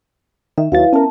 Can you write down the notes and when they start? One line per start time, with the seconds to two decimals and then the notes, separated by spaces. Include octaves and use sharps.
0.58 D#3 E5
0.72 D#2 F#3 E4 B4 F5 A6
0.93 B3 C#4 A#4 E5 A5